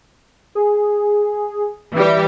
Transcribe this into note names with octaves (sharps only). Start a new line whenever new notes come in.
G#4
E3 G3 G4 E5